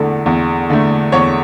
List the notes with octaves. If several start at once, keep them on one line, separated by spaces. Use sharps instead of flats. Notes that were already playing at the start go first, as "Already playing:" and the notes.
Already playing: E2 D3 A3
E2
D3 A3
E2 C#5